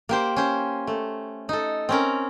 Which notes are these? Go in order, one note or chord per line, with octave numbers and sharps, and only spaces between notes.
A#3 G4 C5
C#4 C5
A3
D#4 A4
C4 C#4 A#4